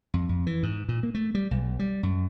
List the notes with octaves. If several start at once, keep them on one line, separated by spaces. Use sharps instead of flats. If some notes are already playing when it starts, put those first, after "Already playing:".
F2
F2
E3
G#2
A#2
A#3
A3
G3
B1
G3
F#2